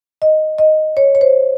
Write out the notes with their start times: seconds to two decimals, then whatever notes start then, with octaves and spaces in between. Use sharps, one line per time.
0.22 D#5
0.58 D#5
0.97 C#5
1.15 C#5
1.21 C5